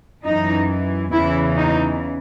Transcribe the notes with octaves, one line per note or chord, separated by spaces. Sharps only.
F#2 E3 D#4
E2 C#3 E3 E4
D#4